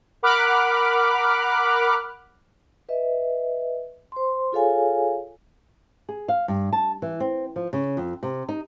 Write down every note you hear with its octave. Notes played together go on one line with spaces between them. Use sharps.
A#4 F#5 B5 D6 F6 F#6
B4 D#5 E5
C5 C6
F4 G#4 A4 C#5 F5 G#5
G#4
F5
G2
A5
E3
C4
F3
C#3
F2
C3
D#4